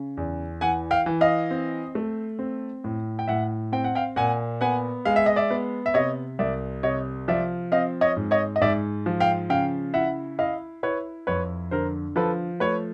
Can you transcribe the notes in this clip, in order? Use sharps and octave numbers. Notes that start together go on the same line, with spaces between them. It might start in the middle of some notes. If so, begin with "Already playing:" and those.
Already playing: C#3
E2
E3 F#5 G#5
F5 G5
E3
D#5 F5
C4
A3
C4
A2
G5
A2 E5 F#5
C4 G5
F#5
F5 G5
A#2 F#5 G#5
B3 F#5 G#5
G#3 F5
E5
D#5
D5 E5
B3
E5
C3 C#5 D#5
C2 D5 E5
C3 C#5 D#5
F3 D5 E5
C4 D#5 F5
C#5 D#5
G#2
C#5 D#5
D#5
G#2 D5 E5
F3
F5 G5
C#3 F5 G5
E4 E5 F#5
E4 D#5 F5
E4 B4 C#5
F2 B4 C#5
D3 A#4 C5
F3 A4 B4
A3 B4 C#5